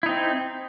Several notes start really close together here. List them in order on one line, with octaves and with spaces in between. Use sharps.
E4 D#4 C4